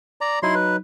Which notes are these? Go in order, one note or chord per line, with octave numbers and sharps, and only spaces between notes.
D5 A#5
F#3 D#4 E4 C6
B4